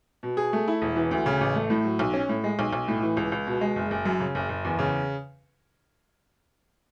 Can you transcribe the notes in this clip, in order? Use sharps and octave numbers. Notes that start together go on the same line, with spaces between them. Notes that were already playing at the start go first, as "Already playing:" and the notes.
B2
G#4
A3
E4
E1
E3
D2
C#3
A1
A3
A2
F#3
B1
C#4
A2
G#3
B1
B1
A2
E3
C#2
C#2
B2
G#3
F#1
F#1
F#2
C#3
F#1
F#1
E2
C#3